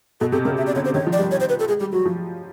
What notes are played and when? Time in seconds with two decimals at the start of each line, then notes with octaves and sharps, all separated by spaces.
0.20 B2 A4
0.32 C3 A4
0.45 C#3 A#4
0.57 E5
0.67 D5
0.76 D3 C#5
0.85 C5
0.94 D#3 C#5
1.07 F3
1.13 D5
1.19 G3
1.31 C#5
1.40 C5
1.49 B4
1.60 A4
1.68 G#3 G#4
1.80 G3 G4
1.93 F#3 F#4
2.05 F3